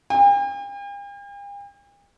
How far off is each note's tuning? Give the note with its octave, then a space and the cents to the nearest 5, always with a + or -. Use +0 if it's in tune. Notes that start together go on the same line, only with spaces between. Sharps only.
G5 +45